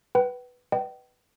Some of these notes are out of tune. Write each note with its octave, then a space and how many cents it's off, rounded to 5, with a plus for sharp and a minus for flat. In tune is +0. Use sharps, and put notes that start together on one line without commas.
B4 +0 G5 -45
B4 +0 D#5 -30 G5 -35